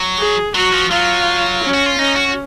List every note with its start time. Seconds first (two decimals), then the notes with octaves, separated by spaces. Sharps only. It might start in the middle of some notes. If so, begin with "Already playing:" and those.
Already playing: F#3
0.19 G#4
0.55 F#3 F#4
0.73 F3
0.91 F#3 F4
1.63 C#4
1.74 F#4
1.86 F4
1.98 C#4 D#4
2.16 F#4